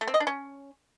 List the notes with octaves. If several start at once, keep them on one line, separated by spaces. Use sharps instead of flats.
A3
C4
D#5
D4
C#4